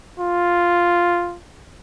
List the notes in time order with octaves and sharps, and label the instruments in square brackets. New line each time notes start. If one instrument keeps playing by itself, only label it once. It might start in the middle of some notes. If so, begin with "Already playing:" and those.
[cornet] F4